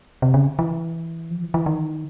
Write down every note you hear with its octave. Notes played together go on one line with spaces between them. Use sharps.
C3
C#3
E3
F3
E3
E3
D#3